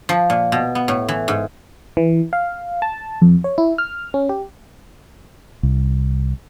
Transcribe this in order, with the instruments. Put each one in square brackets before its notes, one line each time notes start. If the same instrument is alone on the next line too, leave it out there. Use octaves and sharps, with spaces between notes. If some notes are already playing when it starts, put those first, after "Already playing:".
[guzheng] F3
A#2
B2
B3
A2
E3
G#2
[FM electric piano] E3
F5
A5
F2
C#5
E4
F6
C#4
G4
[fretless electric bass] C2